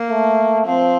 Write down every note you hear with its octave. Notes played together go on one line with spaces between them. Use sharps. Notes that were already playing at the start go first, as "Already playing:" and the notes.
Already playing: A#3
A3
F3 C4